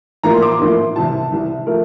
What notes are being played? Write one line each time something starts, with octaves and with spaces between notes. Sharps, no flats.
A1 A2 F3 A#3 A#5
C6
D6
C6
A1 A2 F3 A#3
C2 C3 E3 A5
C2 C3 E3
F3 A3 A#4